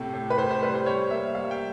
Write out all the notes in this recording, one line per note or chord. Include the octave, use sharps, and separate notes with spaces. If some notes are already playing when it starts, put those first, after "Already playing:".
Already playing: A2 C3
A2
B4
A2 C5
C5
G3 B4
C5
G3 C#5
A#3 E5
G3 F5
G5